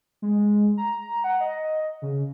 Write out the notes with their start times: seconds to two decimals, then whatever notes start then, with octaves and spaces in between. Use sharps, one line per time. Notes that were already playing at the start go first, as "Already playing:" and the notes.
0.22 G#3
0.77 A#5
1.24 F#5
1.40 D#5
2.02 C#3